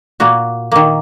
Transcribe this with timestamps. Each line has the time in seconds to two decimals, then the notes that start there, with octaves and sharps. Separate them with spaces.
0.20 A#2 A#3 F#4
0.72 D#3 A#3